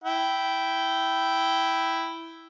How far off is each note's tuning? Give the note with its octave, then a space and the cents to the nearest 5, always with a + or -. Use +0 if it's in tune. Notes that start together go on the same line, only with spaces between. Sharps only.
E4 +0 G5 -10